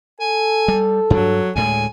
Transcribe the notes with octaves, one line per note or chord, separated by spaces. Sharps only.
A4 G#5
G3
G2 F#3 D4
D2 A2 G#3 G#5